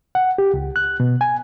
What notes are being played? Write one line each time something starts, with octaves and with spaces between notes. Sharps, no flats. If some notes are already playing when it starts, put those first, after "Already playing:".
F#5
G4
C#2
F#6
B2
G#5